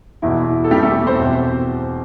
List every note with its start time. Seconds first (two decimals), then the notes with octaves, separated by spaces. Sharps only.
0.22 E2 B2 E4
0.64 A4
0.70 B2 G3 G4
0.74 E2
0.82 A3 A4
1.06 C4 C5
1.18 E2 B2